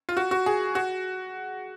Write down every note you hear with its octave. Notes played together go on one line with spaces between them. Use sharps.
F4
F#4
F#4
G#4
F#4